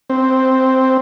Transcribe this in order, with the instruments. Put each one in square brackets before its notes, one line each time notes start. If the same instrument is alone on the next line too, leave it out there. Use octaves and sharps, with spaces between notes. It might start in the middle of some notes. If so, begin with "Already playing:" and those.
[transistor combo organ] C4